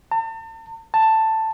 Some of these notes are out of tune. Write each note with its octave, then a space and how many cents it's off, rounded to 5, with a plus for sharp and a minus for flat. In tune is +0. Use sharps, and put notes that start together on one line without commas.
A5 +45
A5 +10